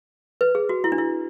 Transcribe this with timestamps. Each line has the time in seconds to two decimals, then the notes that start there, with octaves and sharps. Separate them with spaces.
0.41 B4
0.55 G#4
0.69 F#4
0.84 E4
0.92 D4
0.98 E4